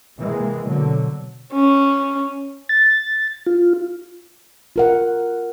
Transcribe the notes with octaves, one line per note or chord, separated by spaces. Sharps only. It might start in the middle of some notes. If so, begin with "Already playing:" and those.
C3 E3 G#3 A#3
B2 D3 F#3
C#4
A6
F4
F4 A#4 F#5